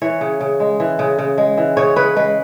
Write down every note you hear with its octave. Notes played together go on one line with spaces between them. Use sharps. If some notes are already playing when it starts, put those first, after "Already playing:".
E3 C#5
C#3
C#3
G#3
E3
C#3
C#3
G#3
E3
C#3 C#5
C#3 B4
G#3 B4